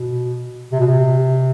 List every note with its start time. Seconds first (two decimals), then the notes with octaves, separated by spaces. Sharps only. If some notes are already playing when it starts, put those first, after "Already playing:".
Already playing: B2
0.72 C3
0.80 B2
0.86 C3